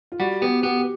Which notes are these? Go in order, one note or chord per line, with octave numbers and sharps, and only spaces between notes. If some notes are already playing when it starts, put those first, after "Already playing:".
F4
G3 F#4
B3 G4
B3 G4
G4